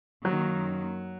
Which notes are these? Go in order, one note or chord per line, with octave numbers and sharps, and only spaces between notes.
F#2 D#3 F#3 A#3